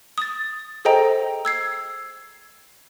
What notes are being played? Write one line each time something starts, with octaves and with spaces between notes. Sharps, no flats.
D#6 A6
G#4 A4 C5 D#5 G5 A#5
E6 G#6 C7